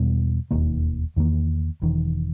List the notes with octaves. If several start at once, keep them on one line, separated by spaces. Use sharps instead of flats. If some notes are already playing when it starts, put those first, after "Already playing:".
Already playing: E2 B2 G3 B3
E1 D#2 D#3 A#3
E2 D#3 A#3
E1 E2 D#3